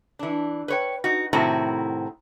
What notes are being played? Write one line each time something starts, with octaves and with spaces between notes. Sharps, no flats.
E3 D4
B4 C#5 G5
D#4 F#4
A2 C3 D#3 C4 E4 F#4